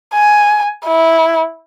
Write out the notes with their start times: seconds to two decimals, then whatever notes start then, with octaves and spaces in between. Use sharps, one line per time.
0.14 G#5
0.86 E4